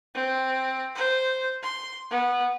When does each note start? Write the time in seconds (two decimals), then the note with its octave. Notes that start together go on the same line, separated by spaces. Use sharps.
0.14 C4
0.95 C5
1.63 C6
2.10 B3